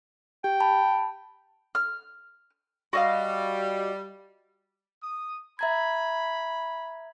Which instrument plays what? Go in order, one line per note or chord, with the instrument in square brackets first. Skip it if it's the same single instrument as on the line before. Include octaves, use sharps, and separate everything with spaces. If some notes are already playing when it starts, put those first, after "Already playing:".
[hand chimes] G4 [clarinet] G5
[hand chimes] A5 B5
[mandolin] F6
[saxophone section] G3 [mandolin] F#4 D#5 F5
[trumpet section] D#6
[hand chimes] E5 A#5 G#6 [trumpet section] B5